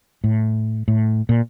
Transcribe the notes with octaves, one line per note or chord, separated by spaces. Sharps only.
A2
A2
A#2